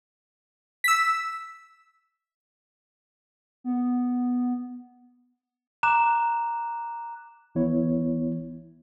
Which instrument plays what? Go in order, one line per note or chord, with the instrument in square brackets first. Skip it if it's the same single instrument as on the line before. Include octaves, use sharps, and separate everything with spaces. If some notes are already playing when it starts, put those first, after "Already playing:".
[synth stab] E6 B6
[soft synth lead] B3
[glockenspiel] A#5 D6 F#6 E7
[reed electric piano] C2 E3 B3 E4 C#5